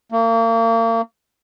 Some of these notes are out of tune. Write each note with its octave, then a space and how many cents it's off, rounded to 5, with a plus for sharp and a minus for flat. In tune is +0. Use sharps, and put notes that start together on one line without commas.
A#3 -35